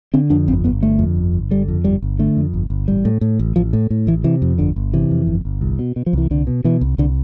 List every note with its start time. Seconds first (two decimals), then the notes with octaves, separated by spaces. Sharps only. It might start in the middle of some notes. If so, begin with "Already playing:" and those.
0.14 D3 C4
0.30 F2 D4
0.48 G1 C4
0.64 G1 B3
0.81 D3 A3
0.99 F2
1.16 G1
1.33 G1
1.51 D3 G3
1.68 F2
1.84 G1 G3
2.02 G1
2.19 D3 A3
2.37 F2
2.54 G1
2.70 G1
2.88 A1 G3
3.05 A2
3.21 A2
3.39 A1
3.56 A1 F3
3.73 A2
3.90 A2
4.07 A1 E3
4.24 C3 E3
4.42 F2
4.58 G1 D3
4.76 G1
4.93 C3 E3
5.11 F2
5.27 G1
5.45 G1
5.61 C2
5.79 B2
5.96 B2
6.06 F3
6.13 C2 E3
6.30 C2 D3
6.47 B2
6.64 B2 E3
6.81 C2
6.98 C2 D3